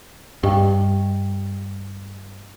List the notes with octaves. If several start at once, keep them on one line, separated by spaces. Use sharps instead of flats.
G2 G4 D#5 G5